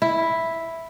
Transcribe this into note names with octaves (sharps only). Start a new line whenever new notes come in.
E4